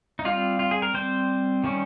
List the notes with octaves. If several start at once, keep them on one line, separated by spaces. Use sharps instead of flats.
D#4
G3 C4 F4
F4
G#4
A#4
G3 C4 C5
D#3 G3 C#4